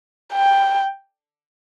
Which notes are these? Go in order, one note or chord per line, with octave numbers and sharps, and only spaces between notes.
G5